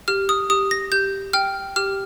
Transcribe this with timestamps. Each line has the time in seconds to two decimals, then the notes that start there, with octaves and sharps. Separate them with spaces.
0.08 G4 F6
0.29 D#6
0.50 G4 D#6
0.71 A#6
0.92 G4 G6
1.33 G5 F6
1.76 G4 F6